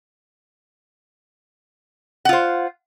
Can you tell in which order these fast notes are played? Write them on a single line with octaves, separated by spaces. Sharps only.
F#5 F4 C5